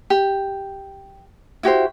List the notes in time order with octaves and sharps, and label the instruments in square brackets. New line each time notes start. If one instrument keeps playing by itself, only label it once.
[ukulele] G4
E4 F#4 G4 C5